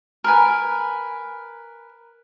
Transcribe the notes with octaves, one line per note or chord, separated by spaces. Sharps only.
A#4 B4 G#5